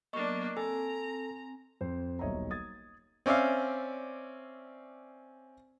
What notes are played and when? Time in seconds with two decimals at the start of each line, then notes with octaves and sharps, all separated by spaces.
0.13 F#3 A#3 B3 D4 D#5 C#6
0.57 C4 A4 G#5 A#5
1.81 F2 C5
2.19 D#1 B1 C#5 D#5 E5 A#5
2.51 D#6 G#6 A6
3.26 C4 C#4 D5 E5 F5